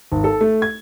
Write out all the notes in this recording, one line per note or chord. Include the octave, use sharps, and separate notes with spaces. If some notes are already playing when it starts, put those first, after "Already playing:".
G#1
A4
A3
G#6